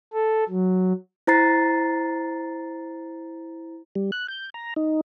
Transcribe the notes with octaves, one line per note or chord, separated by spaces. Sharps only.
A4
F#3
E4 C5 A#5 A6 C7
G3
F#6
G6
A#5
D#4